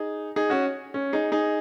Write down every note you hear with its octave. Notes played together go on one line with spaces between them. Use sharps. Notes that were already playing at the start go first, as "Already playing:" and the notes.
Already playing: D#4 G#4
D#4 G#4
C#4 F#4
C#4
D#4 G#4
D#4 G#4